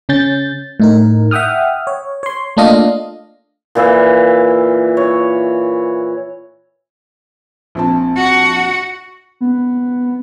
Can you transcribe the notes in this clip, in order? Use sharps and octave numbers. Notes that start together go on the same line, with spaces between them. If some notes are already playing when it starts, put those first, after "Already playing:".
C#3 C#4 G6 A6
A2 D#4 A#4
E5 F#5 G5 D#6 F6
C#5
C#5 C6
A3 A#3 D4 F4 D#5 F5
A#2 E3 E5 F5
C#5
A#1 C4 A5
F#4 F#5
B3